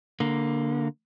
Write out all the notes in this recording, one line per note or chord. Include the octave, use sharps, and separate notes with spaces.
D3 A#3